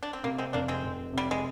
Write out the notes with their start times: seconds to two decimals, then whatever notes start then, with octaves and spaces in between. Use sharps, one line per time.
0.03 D4
0.13 C4
0.24 C3 A#3
0.38 G#3 C4
0.53 F1 A#3 D4
0.68 G#3 C4
0.84 F1
1.13 C3 G3
1.31 G#3